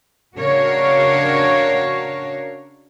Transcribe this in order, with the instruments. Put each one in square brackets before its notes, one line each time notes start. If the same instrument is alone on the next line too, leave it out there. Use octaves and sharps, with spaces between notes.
[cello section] C#3 D4 F#4 A#4 C#5 F5